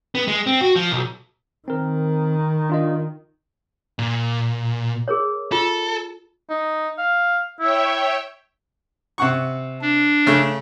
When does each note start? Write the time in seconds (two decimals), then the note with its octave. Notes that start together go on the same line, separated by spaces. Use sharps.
0.15 B3
0.28 G#3
0.46 C4
0.61 F#4
0.76 F3
0.91 B1
1.68 D#3 C4 A#4
2.70 D4 F4 D#5
3.99 A#2
5.08 G#4 A#4 C#5
5.52 F4 A4
6.49 D#4
6.98 F5
7.60 E4 C#5 E5 G5
9.18 C3 F#5 C#6
9.81 D4
10.26 C#3 A3